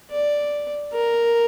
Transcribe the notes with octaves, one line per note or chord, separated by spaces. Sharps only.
D5
A#4